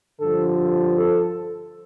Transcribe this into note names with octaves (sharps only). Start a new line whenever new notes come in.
G2 D3 F3 A4
A4